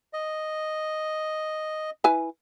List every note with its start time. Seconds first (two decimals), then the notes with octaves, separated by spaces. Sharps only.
0.13 D#5
2.04 E4 B4 G#5